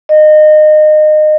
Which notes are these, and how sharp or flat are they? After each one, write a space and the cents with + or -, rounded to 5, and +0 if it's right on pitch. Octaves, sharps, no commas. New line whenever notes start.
D#5 -25